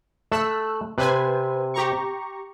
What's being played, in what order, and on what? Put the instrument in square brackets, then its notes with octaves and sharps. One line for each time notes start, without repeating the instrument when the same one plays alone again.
[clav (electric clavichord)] A3 [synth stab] E6 F#6
[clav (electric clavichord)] C3 [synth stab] B4 C5 G#5
[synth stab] G4 A#5 C#6